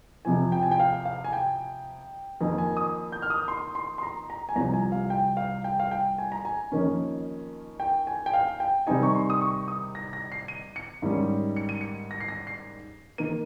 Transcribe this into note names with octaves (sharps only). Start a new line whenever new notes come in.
F2 C3 F3 G#5
G5
G#5
G5
F5
F5
G#5
G5
F2 D#3 A#3 G#5
G#5
D#6
G6
F6
D#6
C6
C6
C6
A#5
A#5
G#5
C2 C3 F3 A#5
G#5
F5
G5
F5
G5
F5
G5
G#5
A#5
G#5
F2 D#3 A#3 C#4
G5
G#5
G5
F5
G5
C3 D#3 G3 C4 D#4 G#5
C#6
C6
D#6
C#6
D#6
A#6
A#6
C7
D#7
C#7
G#2 D#3 G3 C#4
C#7
D#7
C#7
A#6
C7
A#6
C7
D#3 A#3 D#7